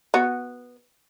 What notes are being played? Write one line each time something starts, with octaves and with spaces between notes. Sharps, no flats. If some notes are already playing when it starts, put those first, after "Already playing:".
B3 F#4